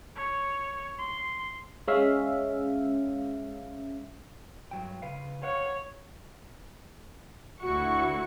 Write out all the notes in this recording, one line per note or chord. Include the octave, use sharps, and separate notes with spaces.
C#5
C6
G#3 C#4 E5 F5
G2 F#3 G5
C#3 B4 F5
C#5 F5 F#5
D2 E4 F#4 C#6 C#7